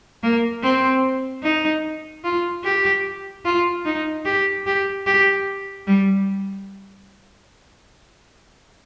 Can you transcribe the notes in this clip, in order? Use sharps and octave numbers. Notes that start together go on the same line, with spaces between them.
A#3
C4
D#4
F4
G4
F4
D#4
G4
G4
G4
G3